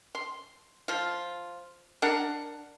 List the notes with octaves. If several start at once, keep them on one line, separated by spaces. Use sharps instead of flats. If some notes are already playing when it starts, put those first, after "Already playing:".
C6
F3 F4
D4 A#4 F#5